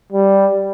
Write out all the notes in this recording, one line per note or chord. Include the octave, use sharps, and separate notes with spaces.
G3